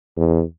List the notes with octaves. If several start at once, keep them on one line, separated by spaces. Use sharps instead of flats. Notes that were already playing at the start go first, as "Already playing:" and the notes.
E2